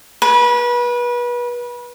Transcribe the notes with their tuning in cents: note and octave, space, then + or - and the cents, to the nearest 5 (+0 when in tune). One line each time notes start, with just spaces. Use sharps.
B4 -30